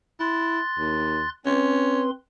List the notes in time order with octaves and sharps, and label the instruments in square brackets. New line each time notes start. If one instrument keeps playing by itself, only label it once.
[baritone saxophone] E4 [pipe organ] C6 F#6 A6
[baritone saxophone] D#2
[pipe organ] C4 B4 C6 [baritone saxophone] C#4